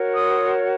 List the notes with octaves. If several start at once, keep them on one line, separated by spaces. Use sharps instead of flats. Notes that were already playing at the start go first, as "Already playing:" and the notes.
Already playing: F#4 A#4 C#5
C6 D#6